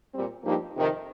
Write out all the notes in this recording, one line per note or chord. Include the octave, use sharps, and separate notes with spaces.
A#2 G3 C4
G2 F3 A#3 D#4 G4
F2 C3 D#3